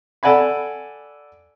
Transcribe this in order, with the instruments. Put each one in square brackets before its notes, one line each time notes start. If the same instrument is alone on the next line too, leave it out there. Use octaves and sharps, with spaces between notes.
[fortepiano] A4 D5 F#5 G#5 B5